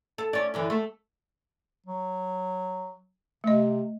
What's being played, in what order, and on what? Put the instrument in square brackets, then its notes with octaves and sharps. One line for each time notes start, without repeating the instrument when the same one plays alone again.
[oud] A4
C#4 D5
F#2 D3 E3
A3
[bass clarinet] F#3
[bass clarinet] C3 [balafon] A3 D#5